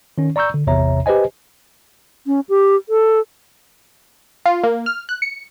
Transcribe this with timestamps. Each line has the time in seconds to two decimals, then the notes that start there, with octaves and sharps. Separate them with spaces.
0.18 D#3 C#4
0.36 D5 A#5 C#6 E6 G6
0.54 D3
0.67 G#1 E2 C3 C#5 E5 A#5
1.06 G4 B4 C5 D#5 G#5
2.27 C#4
2.49 G4
2.89 A4
4.46 F4
4.64 A#3
4.86 F6
5.09 F#6
5.22 C#7